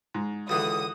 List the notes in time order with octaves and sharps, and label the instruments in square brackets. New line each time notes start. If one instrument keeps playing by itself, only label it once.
[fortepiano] G#2
[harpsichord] C#2 D3 [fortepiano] E3 F#4 [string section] D#6